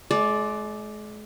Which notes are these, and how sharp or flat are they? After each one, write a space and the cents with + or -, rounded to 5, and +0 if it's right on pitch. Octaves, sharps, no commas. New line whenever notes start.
G#3 +40 D5 +0